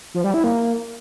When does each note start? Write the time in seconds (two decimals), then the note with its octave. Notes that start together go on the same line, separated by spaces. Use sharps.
0.14 F3
0.24 G3
0.34 E4
0.44 A#3